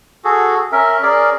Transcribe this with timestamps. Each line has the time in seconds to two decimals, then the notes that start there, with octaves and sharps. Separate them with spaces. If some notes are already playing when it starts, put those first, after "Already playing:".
0.24 F#4 G#4 A4
0.72 C#4 A#4 E5
1.03 C#4 G#4 A#4 D5